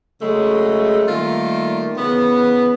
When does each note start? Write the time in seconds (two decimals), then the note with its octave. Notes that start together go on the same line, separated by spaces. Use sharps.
0.21 C#3 F#3 G#3 A3
1.08 D#3 G3 A3 A#3 F4
1.96 C#3 E3 B3